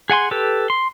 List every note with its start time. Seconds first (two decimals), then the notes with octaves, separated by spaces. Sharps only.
0.10 G#4 F#5 G#5 C6
0.31 G4 A4 B4
0.70 C6